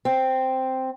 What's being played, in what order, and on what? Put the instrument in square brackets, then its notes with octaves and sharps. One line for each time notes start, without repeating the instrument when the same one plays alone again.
[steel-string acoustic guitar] C4